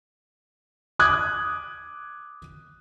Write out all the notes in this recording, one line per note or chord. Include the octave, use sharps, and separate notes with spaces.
D6 D#6 F#6 G#6